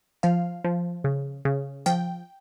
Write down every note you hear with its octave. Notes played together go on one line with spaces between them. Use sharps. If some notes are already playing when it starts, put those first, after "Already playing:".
F3 F5
F3
C#3
C#3
F3 G5